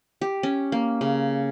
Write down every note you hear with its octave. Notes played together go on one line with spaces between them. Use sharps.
G4
C#4
A#3
C#3